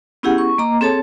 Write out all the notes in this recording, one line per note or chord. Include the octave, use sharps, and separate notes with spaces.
B3 C#4 E4 G4 G#4 F#5
C#6
A#3 D#5 A#5 D6
C4 G#4 A4 C#5 A5